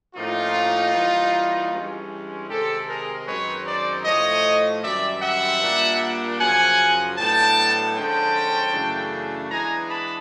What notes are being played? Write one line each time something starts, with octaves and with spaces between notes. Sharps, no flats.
A2 F3 A#3 C#4 D#4 F4
E3 G3 A#3
G2 E3 G#3 C#4
C3 D#3 G#3 C4 G4 A4
G#4 A#4
F#2 D#3 G#3 C4 D#4 B4 C#5
C5 D5
A2 F3 A3 C#5 D#5
F#2 D#3 G3 C4 D5 E5
E5 F#5
A#2 G3 A#3 D4
F#2 C#3 F3 F#5 G#5
A2 F#3 B3 D4 G5 A5
D3 F3 G#3 C#4 G5 A5
F#2 C#3 E3 A3 D4
E3 G#3 B3 D4 G#5 A#5
A5 B5